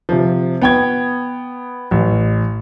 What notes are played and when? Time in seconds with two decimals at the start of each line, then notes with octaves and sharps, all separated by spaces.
0.09 C3 F3
0.62 B3 G5 G#6
1.91 A1